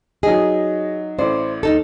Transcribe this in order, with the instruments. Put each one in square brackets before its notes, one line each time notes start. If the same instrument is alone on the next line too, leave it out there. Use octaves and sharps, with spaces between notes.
[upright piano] F#3 D#4 D#5 [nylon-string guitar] G#4
[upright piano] A1 A2 D5 [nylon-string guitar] C5
[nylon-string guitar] D#2 D#4 A4